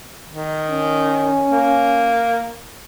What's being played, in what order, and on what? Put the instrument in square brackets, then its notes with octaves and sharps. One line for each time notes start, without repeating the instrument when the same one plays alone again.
[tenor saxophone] D#3
[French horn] C#4
[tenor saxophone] A#3